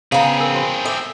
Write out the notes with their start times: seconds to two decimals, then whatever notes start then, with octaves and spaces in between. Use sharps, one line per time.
0.12 C#3 B3 C4 G#4 F5 A#5
0.40 A#4
0.55 F#4 C5 B5
0.85 A4 E5 D6